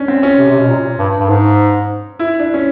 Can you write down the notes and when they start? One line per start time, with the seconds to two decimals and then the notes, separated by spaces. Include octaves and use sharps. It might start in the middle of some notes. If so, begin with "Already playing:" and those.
Already playing: C#4 D4
0.08 C4
0.23 C#4
0.38 C3
0.50 C3
0.59 B2
0.68 A#2
0.99 G2
1.20 G2
1.29 G#2
2.19 E4
2.39 D4
2.54 C#4